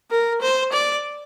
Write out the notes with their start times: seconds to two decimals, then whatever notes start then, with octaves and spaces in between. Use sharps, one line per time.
0.11 A#4
0.41 C5
0.72 D5